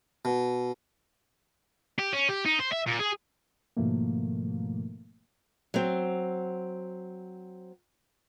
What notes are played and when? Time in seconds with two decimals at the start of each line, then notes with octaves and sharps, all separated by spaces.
0.25 B2
1.99 G4
2.13 C#4
2.29 G4
2.46 D#4
2.60 C5
2.73 E5
2.87 A#2
3.00 G#4
3.77 G#2 B2 D#3 F3 A3 A#3
5.74 F#3 C4